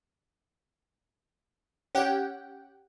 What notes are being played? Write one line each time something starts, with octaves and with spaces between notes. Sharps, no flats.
C#4 G4 F#5 G5